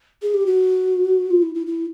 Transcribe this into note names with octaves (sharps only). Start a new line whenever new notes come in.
G#4
G4
F#4
F4
E4
E4
E4